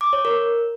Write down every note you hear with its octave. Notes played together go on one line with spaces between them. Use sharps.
D6
C#5
A#4